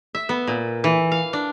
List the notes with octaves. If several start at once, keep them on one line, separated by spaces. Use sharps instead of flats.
E5
B3
A#2
E3
F5
D4